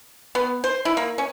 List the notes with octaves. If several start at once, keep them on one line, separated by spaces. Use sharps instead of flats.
B3
C5
E4
A#3
C#4